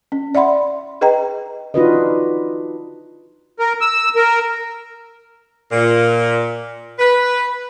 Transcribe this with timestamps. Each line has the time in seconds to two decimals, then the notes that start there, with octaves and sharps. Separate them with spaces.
0.12 C#4
0.35 D5 E5 F#5 B5 C6
1.01 G#4 B4 D#5 G5 A#5
1.74 D4 D#4 F4 F#4 B4 D#5
3.59 A#4
3.81 E6
4.16 A#4
5.72 A#2
6.99 B4